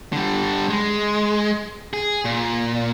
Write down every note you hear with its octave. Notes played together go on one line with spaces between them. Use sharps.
D3 G3
G#3
G#4
A#2